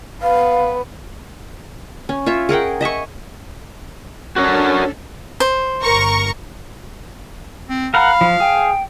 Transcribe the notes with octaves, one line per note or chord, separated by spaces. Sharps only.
B3 B4 F5
C#4
F4 C#5 E5
G#4 A#4 F#5 G5
D#5 E5 G#5 C#6
C#4 D4 F#4 A4 A#4 C#5
C5
G1 A#4 C#6
C4
A#4 F5 F#5 B5
F3
G#4 G5